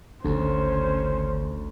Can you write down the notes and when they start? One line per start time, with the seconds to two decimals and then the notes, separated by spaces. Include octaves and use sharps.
0.25 G#1 D2 D3 C#4 C5